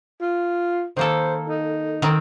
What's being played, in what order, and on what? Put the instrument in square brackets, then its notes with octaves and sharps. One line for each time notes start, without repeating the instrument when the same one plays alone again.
[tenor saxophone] F4
[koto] D#3 A#3 A4 [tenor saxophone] C5
[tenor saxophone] D#4
[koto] D#3 C4